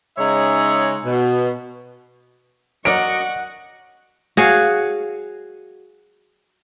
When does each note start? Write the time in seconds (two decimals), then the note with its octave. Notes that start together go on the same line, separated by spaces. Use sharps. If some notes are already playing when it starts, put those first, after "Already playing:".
0.18 C#3 G#3 D#4 G#4 C#5 E5
1.06 B2
2.85 F#3 A#4 D5 D#5 F#5 C#6 D7
4.37 F#4 G#4 C#5 F5